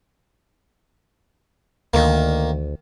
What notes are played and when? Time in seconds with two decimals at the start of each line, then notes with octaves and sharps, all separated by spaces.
1.94 D2 D#3 A#3